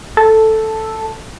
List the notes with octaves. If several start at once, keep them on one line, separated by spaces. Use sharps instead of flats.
A4